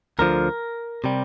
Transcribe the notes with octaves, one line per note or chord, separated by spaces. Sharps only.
D2 D3 F3 A#4
C3 G3